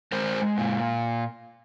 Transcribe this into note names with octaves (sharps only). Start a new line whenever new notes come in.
G#3 A#4 C5
A#2